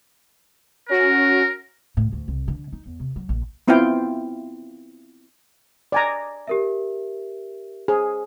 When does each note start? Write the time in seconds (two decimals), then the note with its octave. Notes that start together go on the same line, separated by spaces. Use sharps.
0.89 C#4 F#4 A#4
1.97 A2
2.13 D2
2.28 C2
2.48 D3
2.73 D#4
2.86 E2
3.00 C3
3.16 F#3
3.29 A#1
3.68 B3 C4 E4 F4 F5 G5
5.92 D5 G#5 A#5
6.47 G4 A#4 E5
7.88 G#4 C5